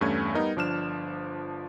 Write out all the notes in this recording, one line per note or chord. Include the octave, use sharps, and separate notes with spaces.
E2 G2 A3 C#4 A4 G#6
G3 B3 D#4 A#4
G1 F3 D4 F6 E7